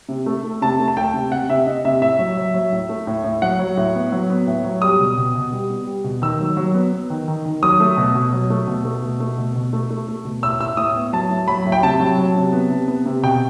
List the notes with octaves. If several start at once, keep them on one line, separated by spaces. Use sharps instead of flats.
C3
A3
A3
C3 A5
A3
A5
A3 G5
C3
C3 F#5
C3 E5
C3 D#5
C3 E5
A2 E5
F#3
F#3
F#3
A2
A3
A2
A2
F#3 F#5
F#3
A2
B3
F#3
B3
A2
F#3
G3 D#6
B2
B2
B2
G3
B3
G3
B2
D#3 E6
F#3
F#3
B3
B3
D#3
D#3
D#3
F#3 D#6
A3
B2
B2
F#3
A3
B2
A3
B2
A3
B2
B2
A3
A3
A3
B2
A2 E6
A2 E6
A2 D#6
B3
F#3 A5
A2
F#3 B5
A2
G5
C3 A5
F#3
F#3
C3
B3
C3
B3
C3
B2 G5